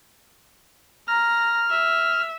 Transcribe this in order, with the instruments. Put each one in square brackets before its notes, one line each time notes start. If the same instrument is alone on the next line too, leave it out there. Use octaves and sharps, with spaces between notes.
[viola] A#5 [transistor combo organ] F6
[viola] E5